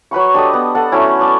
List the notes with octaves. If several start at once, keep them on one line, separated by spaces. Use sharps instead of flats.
F#3 B4 B5 C#6
D4 G4 A4 D#5
B3
A4 F#5
F#3 A3 C#4 E4
D5 A5